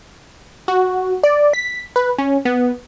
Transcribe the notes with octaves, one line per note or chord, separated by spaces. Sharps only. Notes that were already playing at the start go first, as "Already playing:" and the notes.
F#4
D5
B6
B4
C#4
B3